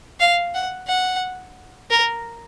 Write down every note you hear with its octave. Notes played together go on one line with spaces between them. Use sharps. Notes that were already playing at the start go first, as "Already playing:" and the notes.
F5
F#5
F#5
A#4